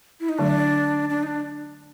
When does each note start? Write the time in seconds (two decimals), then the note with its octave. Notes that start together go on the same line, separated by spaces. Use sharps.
0.20 E4
0.29 D#4
0.38 D3 F#3 A3 D4
1.09 D4
1.23 D#4
1.27 D4